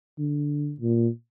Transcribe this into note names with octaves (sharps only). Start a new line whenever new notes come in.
D3
A#2